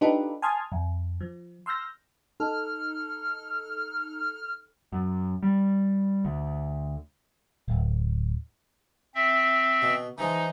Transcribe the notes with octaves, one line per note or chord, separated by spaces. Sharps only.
D4 D#4 F4 G4 A4 B4
G#5 A5 C6 D#6 F6 G#6
F2
F3
C6 E6 F6 G6 A#6
D#4 A4 F6
F#2
G3
D2
D1
C4 E5
B2
E3 F3 G#3 D#4